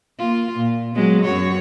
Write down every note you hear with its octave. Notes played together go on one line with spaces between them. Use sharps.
A#3 F4
A#2
F#3 G#3 B3
F#2 F#4 C#5